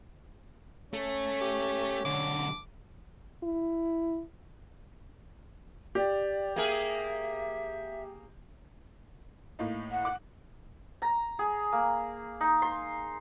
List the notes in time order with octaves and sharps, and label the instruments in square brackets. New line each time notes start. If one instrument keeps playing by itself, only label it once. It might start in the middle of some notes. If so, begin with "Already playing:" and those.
[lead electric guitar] A3 [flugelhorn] C#4
[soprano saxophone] G4
[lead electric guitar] B1 D3 [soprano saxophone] D6
[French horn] E4
[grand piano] G4 [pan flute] D5
[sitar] A#3 G#4 A#4 [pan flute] E5
[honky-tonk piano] A2 A#3 D#4
[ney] F#5
[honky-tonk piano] D6 F#6
[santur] A#5
G#4
A#3
D#4
C6